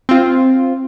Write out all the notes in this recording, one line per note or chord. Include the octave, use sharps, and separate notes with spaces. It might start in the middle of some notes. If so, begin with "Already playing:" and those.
C4 F4